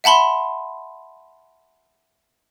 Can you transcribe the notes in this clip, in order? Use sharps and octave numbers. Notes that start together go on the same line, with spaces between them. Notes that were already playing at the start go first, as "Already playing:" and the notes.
E5 F#5 A5 B5 C6